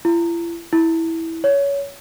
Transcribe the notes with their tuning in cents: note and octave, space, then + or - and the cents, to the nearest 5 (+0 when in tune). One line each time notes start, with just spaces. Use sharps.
E4 +45
E4 -10
C#5 +20